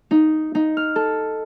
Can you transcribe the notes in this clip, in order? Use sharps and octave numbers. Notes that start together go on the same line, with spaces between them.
D#4
D#4
F6
A4